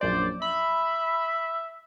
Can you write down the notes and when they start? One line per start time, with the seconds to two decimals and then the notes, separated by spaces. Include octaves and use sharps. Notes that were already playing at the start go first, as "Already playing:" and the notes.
0.01 A#1 F#2 C5 D5
0.42 E5 B5